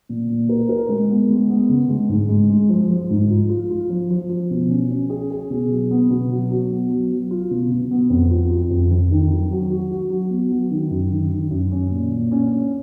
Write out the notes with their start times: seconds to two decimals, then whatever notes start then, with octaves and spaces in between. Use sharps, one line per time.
0.09 A#2
0.30 A#2
0.49 A#4
0.69 A#4
0.89 G#3
1.09 B3
1.29 G#3
1.49 B3
1.69 C#3
1.89 G#3
2.09 G#2
2.29 G#3
2.50 G#3
2.69 F3
2.90 F3
3.10 G#2
3.30 F4
3.49 F4
3.70 F4
3.90 F3
4.10 F3
4.29 F3
4.51 B2
4.70 C#4
4.90 C#4
5.10 G#4
5.31 G#4
5.50 B2
5.70 F#3
5.91 B3
6.10 B2
6.31 F#3
6.51 F#3
6.70 B3
6.90 F#3
7.11 F#3
7.31 F4
7.51 B2
7.71 B2
7.91 B3
8.10 F2
8.30 F4
8.51 F4
8.70 F2
8.91 F2
9.11 D#3
9.30 F#3
9.51 F#3
9.70 F#4
9.91 F#4
10.10 F#3
10.30 B3
10.51 F#3
10.71 D#3
10.91 F#2
11.11 D#3
11.31 D#3
11.51 F#2
11.72 C#4
11.91 A#2
12.11 A#2
12.31 C#4
12.52 C#4